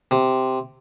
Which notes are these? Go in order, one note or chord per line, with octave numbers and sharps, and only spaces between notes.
C3